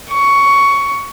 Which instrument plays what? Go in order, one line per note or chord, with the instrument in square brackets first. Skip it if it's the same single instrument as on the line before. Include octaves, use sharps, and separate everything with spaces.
[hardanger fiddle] C#6